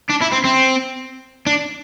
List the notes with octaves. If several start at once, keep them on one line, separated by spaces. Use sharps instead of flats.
D4
E4
C4
C4
D4